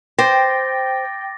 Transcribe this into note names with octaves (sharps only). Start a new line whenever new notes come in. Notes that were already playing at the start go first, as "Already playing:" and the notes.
C5 G5 D6 A6 A#6